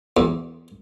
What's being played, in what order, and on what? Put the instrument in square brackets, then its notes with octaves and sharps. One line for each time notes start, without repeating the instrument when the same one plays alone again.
[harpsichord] E2